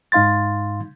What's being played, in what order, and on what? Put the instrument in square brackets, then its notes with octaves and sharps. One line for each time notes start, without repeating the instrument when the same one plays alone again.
[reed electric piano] G#2 D#4 F5 C6 A6